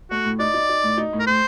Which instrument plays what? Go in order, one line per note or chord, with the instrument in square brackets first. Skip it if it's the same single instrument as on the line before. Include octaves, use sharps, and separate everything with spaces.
[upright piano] A3 [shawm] F#4
[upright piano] A2
[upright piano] D#4 [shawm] D5
[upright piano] D#4
D#4
A2
D#4
A2
[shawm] A#4
[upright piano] A2 [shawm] C5